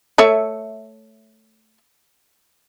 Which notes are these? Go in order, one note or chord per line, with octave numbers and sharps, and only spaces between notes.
A3 C#5 E5